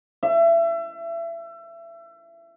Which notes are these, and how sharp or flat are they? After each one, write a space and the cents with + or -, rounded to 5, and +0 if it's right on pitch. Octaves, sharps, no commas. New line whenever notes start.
E5 +30